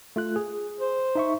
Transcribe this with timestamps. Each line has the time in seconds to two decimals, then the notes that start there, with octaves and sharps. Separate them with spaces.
0.16 A3 F4 F#6
0.36 G#4
0.80 C5
1.15 D#4 E5 C#6